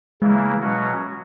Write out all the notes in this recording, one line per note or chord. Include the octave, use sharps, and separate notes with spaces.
C#3 E3 G#3 A#3 E4
B2 F#3 C#4 F#4